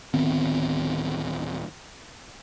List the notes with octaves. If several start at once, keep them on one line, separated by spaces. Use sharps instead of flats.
D1 D#3 B3 C4